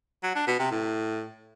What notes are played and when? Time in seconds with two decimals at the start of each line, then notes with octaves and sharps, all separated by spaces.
0.23 F#3
0.35 D4
0.47 B2
0.59 C3
0.71 A2